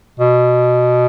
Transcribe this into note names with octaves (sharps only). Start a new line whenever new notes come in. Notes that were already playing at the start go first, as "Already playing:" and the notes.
B2